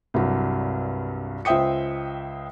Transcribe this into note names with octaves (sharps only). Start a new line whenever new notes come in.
C2 G2 F#3
C#2 C5 E5 G5 D#6 C#7